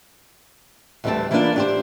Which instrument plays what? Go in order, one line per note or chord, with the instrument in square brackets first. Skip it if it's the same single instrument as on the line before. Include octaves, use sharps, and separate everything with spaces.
[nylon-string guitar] D2 E3 G3 A3 C4 A5
E3 A#3 B3 C#4 D4 F4
D4 G4 C5